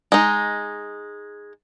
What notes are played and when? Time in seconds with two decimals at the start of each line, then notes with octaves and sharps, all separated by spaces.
0.12 G#3 D#4